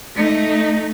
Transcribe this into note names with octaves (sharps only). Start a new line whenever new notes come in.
A3 D#4